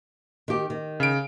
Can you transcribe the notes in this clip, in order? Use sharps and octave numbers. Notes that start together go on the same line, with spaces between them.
D#3 G4
D#3
C#3 D7